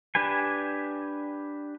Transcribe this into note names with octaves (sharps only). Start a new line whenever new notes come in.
D4 G4 B4 G#5